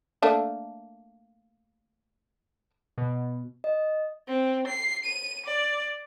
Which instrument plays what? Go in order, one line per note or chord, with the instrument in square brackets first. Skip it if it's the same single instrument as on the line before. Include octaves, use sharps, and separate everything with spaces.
[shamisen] A3 A#3 D4
[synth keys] B2
[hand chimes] D#5
[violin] C4
C7
D#7
D5